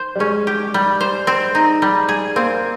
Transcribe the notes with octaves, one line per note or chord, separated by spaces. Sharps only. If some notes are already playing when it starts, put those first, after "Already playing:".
Already playing: C5
G3
G#3 C#4
G4
G3
C5
C4
D#4
G3
G#4
A#3 C4